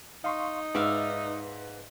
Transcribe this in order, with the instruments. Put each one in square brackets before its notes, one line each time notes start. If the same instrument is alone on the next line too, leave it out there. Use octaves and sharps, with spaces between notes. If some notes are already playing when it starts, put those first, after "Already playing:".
[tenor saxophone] D#4 [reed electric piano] F5 C6 C#6
[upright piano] G#2 [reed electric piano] B4 [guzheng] D5 E5 F5